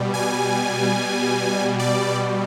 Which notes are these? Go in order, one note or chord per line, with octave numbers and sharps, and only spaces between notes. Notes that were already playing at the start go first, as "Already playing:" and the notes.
Already playing: B2 G3
G#5
D5